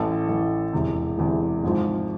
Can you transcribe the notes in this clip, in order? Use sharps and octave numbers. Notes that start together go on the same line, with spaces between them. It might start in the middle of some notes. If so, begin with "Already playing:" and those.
Already playing: A1 A2 E3 A4
A1 A2 E3
E1 E2 C3
E1 E2 C3
G#1 G#2 F3